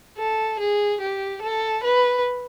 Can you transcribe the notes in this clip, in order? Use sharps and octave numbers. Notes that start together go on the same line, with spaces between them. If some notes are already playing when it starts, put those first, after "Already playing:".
A4
G#4
G4
A4
B4